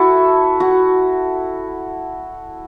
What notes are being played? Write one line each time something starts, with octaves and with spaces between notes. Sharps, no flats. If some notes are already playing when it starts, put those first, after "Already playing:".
Already playing: E4 F#4 A4
F#4